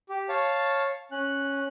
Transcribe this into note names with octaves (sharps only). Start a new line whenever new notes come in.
G4
C#5 F5 A5
C#4 F#6